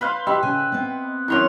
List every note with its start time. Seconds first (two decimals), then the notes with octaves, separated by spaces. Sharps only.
0.01 B4 C5 F5
0.27 G4 D#5 E5 G5 B5
0.43 C#3 G#5
0.72 B3 C4
1.28 F#2 E4 C6 C#6 F7